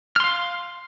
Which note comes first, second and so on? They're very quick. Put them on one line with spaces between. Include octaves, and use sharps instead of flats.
F6 C6 F5